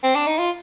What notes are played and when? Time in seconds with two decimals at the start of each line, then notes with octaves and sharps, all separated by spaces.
0.03 C4
0.15 D4
0.27 D#4
0.39 F4